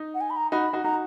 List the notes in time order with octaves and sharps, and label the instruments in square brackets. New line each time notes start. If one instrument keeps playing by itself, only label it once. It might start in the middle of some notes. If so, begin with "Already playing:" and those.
Already playing: [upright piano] D#4
[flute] F#5
G#5
B5
A#5
[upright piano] D#4 F#4 [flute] B5
[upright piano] D#4 F#4
[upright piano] D#4 F#4 [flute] A#5